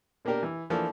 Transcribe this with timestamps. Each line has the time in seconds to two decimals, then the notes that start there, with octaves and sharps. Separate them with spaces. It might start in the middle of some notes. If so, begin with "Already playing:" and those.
0.25 B2 A#3 D4 G4 A#4
0.43 E3
0.70 E3 F3 A3 A#3 D4